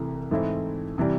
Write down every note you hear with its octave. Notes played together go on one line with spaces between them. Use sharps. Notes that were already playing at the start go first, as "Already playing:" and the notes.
Already playing: C2 C3 E3 A3
G#2 E3 A3 C4 E4
C3 E3 G3